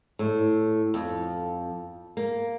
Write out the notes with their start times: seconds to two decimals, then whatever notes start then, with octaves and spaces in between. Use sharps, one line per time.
0.19 A2
0.94 F2
2.17 A#3